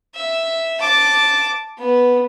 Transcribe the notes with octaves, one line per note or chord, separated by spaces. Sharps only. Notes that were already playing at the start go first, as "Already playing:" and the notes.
E5
A5 D6
B3